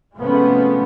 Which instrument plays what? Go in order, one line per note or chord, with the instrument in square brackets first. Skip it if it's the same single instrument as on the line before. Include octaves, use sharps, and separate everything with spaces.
[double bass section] C3 F3 G#3 A3 B3 C#4